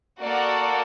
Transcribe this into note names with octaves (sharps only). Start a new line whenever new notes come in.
A#3 F#4 A4 D5 F#5